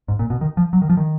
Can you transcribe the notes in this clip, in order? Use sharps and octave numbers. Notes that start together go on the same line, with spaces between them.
G#2
A#2
B2
D#3
F3
F#3
D#3
F3
D#3